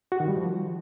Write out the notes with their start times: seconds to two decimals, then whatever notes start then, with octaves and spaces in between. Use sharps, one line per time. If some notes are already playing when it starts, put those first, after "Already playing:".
0.12 F#4
0.20 D#3
0.28 G3
0.36 F3